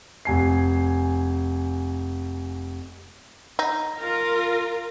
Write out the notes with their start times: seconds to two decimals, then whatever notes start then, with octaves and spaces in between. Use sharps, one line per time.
0.25 F1 G#5 C7
3.59 D#4
4.00 F4 A#4